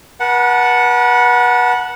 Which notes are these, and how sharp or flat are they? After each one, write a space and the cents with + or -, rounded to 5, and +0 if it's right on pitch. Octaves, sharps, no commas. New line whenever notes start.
B4 -40 F#5 -5 A5 +0